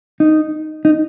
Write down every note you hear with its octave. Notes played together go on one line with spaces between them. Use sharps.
D#4
D#4